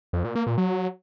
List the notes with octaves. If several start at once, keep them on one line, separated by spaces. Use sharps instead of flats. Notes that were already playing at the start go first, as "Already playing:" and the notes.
F2
A#2
A#3
A#2
F#3